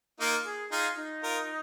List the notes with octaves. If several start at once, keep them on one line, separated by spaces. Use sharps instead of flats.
A#3 D#4 F4
G#4
D#4 F4 G#4
D#4
F4 A#4